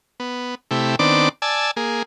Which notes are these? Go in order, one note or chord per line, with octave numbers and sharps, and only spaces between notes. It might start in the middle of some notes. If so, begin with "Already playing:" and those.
B3
C3 A3 E4 G4
D#3 B3 C4 D4 D5 D6
D5 G#5 A5 E6
A#3 G#4